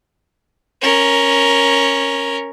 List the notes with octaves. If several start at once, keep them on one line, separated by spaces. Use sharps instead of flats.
C#4 A#4